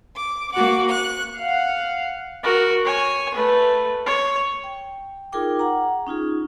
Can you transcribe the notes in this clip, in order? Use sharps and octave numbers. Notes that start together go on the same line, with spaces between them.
D6
A#3 F#4 F#5 D6
C#6 F#6
F5 F#5
F#4 A#4
C#5 G#5
A3 B4
C#5
G5
D#4 F4 G#4 A#4 G5 D6
F#5 A#5
C#4 D#4 F4 G#4